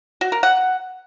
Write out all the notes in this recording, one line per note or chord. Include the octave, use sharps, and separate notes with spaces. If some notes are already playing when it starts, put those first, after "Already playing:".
F#4
A#4
F#5